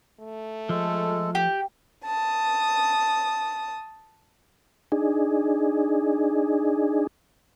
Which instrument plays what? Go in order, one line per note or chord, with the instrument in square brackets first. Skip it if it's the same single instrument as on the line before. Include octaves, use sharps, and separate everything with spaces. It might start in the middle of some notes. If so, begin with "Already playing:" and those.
[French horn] A3
[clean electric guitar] F3 [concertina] G#3 A4
[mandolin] G4
[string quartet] A5 D#6
[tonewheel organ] D4 D#4 G#4